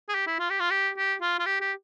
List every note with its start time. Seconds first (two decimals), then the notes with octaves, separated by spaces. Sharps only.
0.09 G#4
0.14 G4
0.27 E4
0.39 F4
0.50 G4
0.60 F4
0.70 G4
0.97 G4
1.21 F4
1.39 F4
1.46 G4
1.61 G4